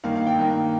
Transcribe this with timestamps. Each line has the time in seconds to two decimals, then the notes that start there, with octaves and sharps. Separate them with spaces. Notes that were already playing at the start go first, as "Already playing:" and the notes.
0.04 G2 D#3 A#3 F5
0.15 F5
0.27 G5
0.38 G2 D#3 A#3